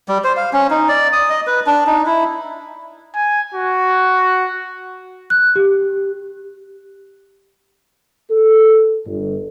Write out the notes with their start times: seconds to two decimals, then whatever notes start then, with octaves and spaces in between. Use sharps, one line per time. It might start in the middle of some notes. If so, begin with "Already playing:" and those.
0.08 G3
0.24 C5
0.37 F5
0.53 C#4
0.70 D#4
0.88 D5
1.13 D#6
1.30 D#5
1.47 B4
1.66 D4
1.87 D#4
2.06 E4
3.15 G#5
3.54 F#4
5.30 F#6
5.56 G4
8.30 A4
9.06 G1